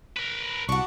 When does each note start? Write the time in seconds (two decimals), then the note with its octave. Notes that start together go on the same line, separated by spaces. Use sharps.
0.17 A#4 B4
0.69 C2 D4 F#4 C#6